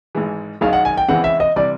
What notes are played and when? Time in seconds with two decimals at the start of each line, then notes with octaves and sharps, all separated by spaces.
0.15 G#1 G#2 E3 G#3
0.61 G#1 F#2 D#3 G#3 F5
0.73 F#5
0.85 G#5
0.98 G5
1.08 E2 C#3 E3 G#3 C4 F#5
1.24 E5
1.40 D#5
1.56 C3 E3 G3 D5